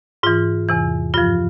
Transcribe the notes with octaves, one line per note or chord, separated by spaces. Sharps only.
G#2 E3 F4
E2 C3 E3
G2 F3 F4